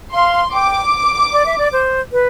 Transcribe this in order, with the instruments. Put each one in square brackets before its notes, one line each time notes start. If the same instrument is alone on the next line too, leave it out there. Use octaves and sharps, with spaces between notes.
[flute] F5 [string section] C6
[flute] G5 [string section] D6
[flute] D5
E5
D5
C5
B4